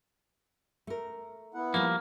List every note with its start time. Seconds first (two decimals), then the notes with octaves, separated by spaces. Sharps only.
0.87 A3 A#4
1.54 B3 E4 F#5
1.74 F3 G3 A#3